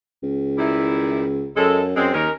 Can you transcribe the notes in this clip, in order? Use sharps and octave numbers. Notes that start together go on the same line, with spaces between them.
C#2
D#3 G3 E4
F#2 G#3 A4
F#2 G#3 C4
D#2 C#4 D#4 A#4